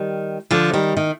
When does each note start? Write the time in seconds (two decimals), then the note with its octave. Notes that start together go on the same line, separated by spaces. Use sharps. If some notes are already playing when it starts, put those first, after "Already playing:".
Already playing: D#3 G3
0.51 D3 F3
0.73 D#3 G3
0.97 D#3